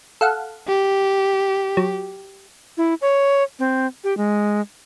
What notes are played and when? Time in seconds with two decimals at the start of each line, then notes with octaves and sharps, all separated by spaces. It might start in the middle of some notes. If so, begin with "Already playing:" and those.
0.21 A4 F5 F#5
0.68 G4
1.77 F#3
2.77 E4
3.02 C#5
3.59 C4
4.04 G4
4.17 G#3